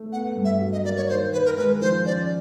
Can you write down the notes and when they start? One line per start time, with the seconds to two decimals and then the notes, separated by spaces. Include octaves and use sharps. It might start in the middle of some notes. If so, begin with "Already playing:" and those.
Already playing: A3
0.12 B3 F#5
0.36 G2
0.45 E5
0.61 F#3
0.72 D#5
0.85 A#3 D5
0.97 C#5
1.09 D#3 C5
1.33 D#3 B4
1.45 A#4
1.57 G#3 B4
1.81 F3 C5
2.05 C#4 D5